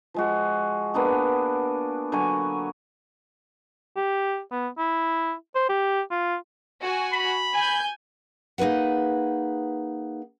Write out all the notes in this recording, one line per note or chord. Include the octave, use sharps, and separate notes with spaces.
F3 G#3 F#4
A#3 B3 D4 G#4
D3 F#3 C#5 G#5
G4
B3
E4
C5
G4
F4
F#4 G#5
B5
G#5 G6
A#3 D#4 G#4 B4 F#5